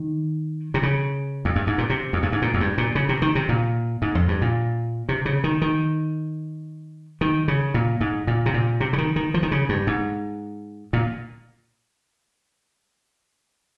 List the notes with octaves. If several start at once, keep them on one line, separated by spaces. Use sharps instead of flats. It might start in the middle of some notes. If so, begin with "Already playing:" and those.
Already playing: D#3
C3
C#3
F2
G2
G#2
A#2
C3
F2
G2
G#2
A#2
F2
G2
A#2
C#3
C3
D#3
C3
A#2
G#2
F2
G2
A#2
C3
C#3
D#3
D#3
D#3
C#3
A#2
G#2
A#2
C3
A#2
C3
C#3
D#3
D#3
F3
D#3
C#3
G2
G#2
A#2